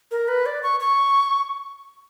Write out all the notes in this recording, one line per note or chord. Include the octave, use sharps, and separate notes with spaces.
A#4
B4
D5
C#6
C#6